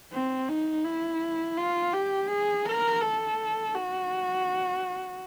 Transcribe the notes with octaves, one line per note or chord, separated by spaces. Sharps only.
C4
D#4
E4
F4
G4
G#4
A#4
A4
F#4